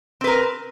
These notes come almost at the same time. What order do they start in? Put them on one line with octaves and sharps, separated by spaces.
C4 B4 A#4